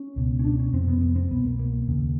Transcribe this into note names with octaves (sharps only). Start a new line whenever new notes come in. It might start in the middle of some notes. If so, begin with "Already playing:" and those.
Already playing: C#4
C#2 B2
C#4
D4
C#4
F2 C3 C4
B3
B3
C4
C2 B2 B3
A#3
A#3
D#2 C#3